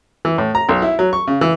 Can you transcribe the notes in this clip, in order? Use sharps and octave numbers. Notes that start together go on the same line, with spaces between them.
E3
A2
A#5
B1
E4
F#3
C#6
C#3
E3